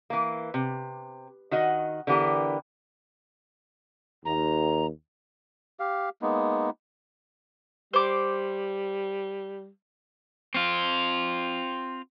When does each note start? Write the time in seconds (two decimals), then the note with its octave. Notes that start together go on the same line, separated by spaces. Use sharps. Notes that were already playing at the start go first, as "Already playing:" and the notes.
0.10 E3 A#3
0.54 C3
1.51 D#3 F#4 D#5 F#5
2.07 D3 E3 B3 G4 A#4
4.25 D#2 A#5
5.80 G4 F5
6.22 G#3 A#3 B3 D#4
7.93 G3 C5 D6
10.54 C4 F4